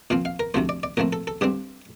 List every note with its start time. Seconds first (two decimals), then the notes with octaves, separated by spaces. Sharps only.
0.10 A#2 F3 C4 F5
0.25 F5
0.40 A#4
0.54 D2 C3 F3 A3 C5
0.69 D5
0.83 D5
0.97 A#2 F3 A3 C4 A#4
1.13 A4
1.27 A4
1.41 G2 D3 G3 C4 G4